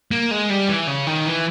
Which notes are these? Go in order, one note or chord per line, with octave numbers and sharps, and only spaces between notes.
A#3
G#3
G3
E3
C#3
D#3
E3